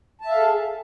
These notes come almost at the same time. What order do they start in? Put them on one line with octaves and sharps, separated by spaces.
A5 E5 F5 A4 G#4